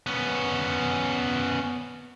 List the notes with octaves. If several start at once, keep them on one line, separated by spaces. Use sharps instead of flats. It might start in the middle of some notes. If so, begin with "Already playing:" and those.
B3 C#4